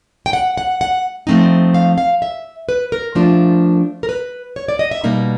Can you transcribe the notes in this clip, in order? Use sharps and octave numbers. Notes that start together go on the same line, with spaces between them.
G5
F#5
F#5
F#5
F3 A3 C4 D#4
F5
F5
E5
B4
A#4
F3 A3 D4 F4
A#4
B4
C#5
D5
D#5
E5
B2 G3 A#3 D#4